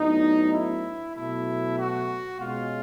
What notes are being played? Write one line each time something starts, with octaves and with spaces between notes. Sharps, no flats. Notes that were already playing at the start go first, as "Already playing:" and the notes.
Already playing: A2 F#3 B3 D4 D#4
E4
B2 F#3 A3 E4
F#4
B2 G#3 C#4 F4